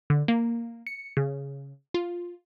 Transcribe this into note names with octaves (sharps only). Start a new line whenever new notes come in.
D3
A#3
C#7
C#3
F4